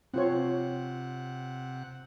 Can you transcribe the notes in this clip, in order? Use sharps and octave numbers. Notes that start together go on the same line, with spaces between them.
C3 C4 F4 C#5 F#5